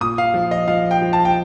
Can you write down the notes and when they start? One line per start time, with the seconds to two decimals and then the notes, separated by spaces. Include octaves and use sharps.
0.01 A#2 D#6
0.18 F5
0.34 F3
0.51 D#5
0.68 F3 F5
0.91 G5
1.02 F3
1.13 A5
1.25 G5